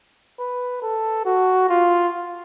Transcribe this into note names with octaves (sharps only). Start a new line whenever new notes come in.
B4
A4
F#4
F4